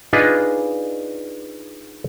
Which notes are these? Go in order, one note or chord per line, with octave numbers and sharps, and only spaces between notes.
D4 D#4 F4 G#4 B4 D#5